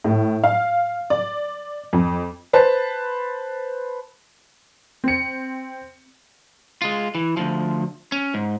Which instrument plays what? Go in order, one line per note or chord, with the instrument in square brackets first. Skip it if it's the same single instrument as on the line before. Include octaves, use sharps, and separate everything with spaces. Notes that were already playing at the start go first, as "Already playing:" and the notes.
[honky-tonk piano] A2
F5
D5
F2
[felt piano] B4 C5 A5
[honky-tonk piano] C4 C#7
[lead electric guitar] G#3 F4
E3
D2 F3
C#4
G#2